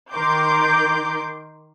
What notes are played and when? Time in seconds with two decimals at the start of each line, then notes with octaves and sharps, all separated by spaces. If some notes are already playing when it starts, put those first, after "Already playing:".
0.12 D#3 A#4 C6 D6 G6